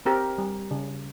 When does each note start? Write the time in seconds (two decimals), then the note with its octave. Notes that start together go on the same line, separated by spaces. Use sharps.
0.05 C4 G4 A#4
0.38 G3
0.71 C#3